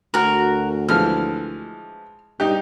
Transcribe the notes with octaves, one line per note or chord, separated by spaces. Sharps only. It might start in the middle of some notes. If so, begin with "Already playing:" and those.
D2 F#4 A#4
E3 F3 G#3 F6
G2 D#4 G4